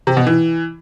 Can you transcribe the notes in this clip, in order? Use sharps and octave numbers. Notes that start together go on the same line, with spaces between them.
C3
B2
E3